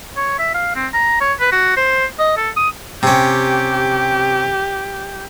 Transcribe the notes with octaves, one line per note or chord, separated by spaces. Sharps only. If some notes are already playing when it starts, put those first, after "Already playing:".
C#5
E5
F5
C4
A#5
C#5
B4
F#4
C5
D#5
A4
D#6
C3 C#4 G4